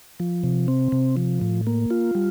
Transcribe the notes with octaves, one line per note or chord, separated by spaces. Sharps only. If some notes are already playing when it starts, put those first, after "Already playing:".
F3
C3
C4
C3
F3
A2
A#3
F4
G3